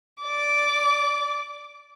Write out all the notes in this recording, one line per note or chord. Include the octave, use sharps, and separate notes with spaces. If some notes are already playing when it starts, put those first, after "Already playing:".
D5 D6